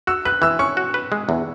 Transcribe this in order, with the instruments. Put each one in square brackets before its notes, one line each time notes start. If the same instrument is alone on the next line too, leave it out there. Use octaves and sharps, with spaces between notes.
[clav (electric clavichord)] F#4 [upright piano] E6
[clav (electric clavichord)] B4 [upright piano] F#6
[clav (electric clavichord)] E3 [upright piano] E6
[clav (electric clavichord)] C#4 [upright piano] C#6
[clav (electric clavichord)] F#4
B4
G#3
E2